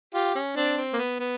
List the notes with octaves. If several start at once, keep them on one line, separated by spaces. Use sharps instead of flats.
F4 G4
C#4
C4 D4
C4
A#3
B3
B3